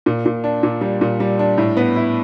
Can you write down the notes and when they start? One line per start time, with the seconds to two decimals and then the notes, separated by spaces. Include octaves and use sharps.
0.06 A#2
0.26 A#2
0.44 D4
0.63 A#2
0.81 G3
1.01 A#2
1.20 G3
1.39 D4
1.58 A2
1.77 B3
1.96 E4